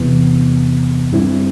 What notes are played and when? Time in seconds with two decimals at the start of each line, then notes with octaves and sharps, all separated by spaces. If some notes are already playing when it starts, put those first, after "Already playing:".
Already playing: E2 C3 E3 B3
1.12 G2 D3 G3 C4 E4